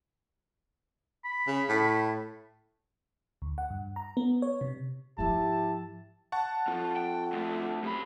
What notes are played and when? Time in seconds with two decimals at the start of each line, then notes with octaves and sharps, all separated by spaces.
1.25 B5
1.47 C#3
1.69 A2
3.42 D2
3.58 F#5
3.70 G2
3.96 A#5
4.17 B3
4.42 C#5
4.61 C3
5.18 G#2 F3 E4 G4 A5
6.32 F#5 A5 C#6
6.68 F2 F3
6.97 G5
7.33 D2 A3
7.83 F#2 C3 B5